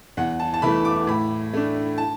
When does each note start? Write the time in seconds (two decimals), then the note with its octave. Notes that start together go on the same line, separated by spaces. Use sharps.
0.17 E2 F#5
0.40 A5
0.54 A5
0.62 E3 A3 B5
0.85 D6
1.07 A2 B5
1.53 A3 D4
1.98 A5